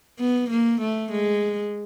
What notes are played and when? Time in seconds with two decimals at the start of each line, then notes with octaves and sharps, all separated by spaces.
0.20 B3
0.50 A#3
0.81 A3
1.12 G#3